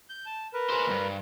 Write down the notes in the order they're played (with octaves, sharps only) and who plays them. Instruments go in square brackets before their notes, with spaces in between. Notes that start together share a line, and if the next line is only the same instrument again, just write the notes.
[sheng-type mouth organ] G6
A5
A#4 B4
[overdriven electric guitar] G#4 C5
D2 G2